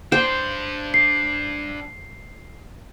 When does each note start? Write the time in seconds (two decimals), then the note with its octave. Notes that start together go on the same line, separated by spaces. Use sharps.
0.12 D4 G4 C5 G5
0.94 C7